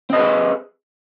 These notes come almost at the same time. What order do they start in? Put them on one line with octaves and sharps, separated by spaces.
C4 D#5 B4 G#4